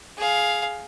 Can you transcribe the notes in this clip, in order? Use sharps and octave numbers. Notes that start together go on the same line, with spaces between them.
G#4 F5